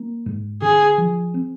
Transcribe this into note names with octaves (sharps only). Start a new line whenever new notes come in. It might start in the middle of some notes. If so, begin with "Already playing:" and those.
Already playing: A#3
G#2
D3 G#4
F3
C4